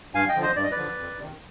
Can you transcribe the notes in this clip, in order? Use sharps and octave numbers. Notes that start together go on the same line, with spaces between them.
G2 F5 G#5
D#5 G5
D3 F3
C5 D#5
G2 D5
D#5
B4 D5
D3 F3
F2
C3 D#3